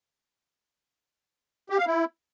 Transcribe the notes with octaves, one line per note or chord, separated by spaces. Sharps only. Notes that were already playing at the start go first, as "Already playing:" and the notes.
G4
F5
E4